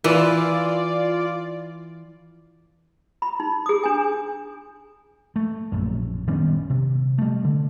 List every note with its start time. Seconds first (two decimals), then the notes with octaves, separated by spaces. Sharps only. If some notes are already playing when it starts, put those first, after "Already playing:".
0.04 E3 F4 D5
3.22 B5
3.40 D#4
3.66 G#4 D#6
3.84 D4 G#5
5.36 A3
5.72 A#1 F#2
6.28 D#3 G3 B3 C#4
6.70 C3
7.18 G3 A3
7.44 D3